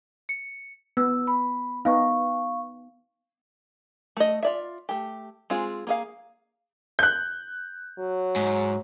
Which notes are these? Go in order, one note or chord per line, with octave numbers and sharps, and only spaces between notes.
C#7
B3 E6
B5
B3 D#4 F5 C#6
A3 D#5
F4 D5 E5
A3 G4
G#3 C4 F4 G#4
A#3 G#4 F5
F#6 G6
F#3
G#2